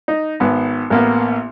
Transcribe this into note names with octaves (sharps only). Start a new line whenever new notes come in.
D#4
G#1 B3
A1 A#3 B3